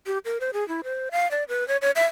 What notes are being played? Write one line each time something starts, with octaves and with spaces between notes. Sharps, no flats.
G4
A#4
C5
G#4
E4
C5
F5
D5
B4
C#5
C#5
E5